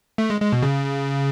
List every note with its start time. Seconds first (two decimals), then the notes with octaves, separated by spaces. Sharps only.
0.18 A3
0.30 G#3
0.41 G#3
0.53 B2
0.63 C#3